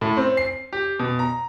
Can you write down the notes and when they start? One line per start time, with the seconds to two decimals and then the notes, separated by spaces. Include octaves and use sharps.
0.01 A2
0.17 C4
0.37 C7
0.73 G4
0.99 B2
1.19 A#5